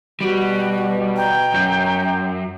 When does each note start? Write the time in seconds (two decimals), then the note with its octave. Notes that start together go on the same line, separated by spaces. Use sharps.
0.21 B2 G3 F#4
1.17 G5 A#5
1.54 F#2